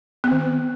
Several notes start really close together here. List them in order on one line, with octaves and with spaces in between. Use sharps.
B3 C4 D#3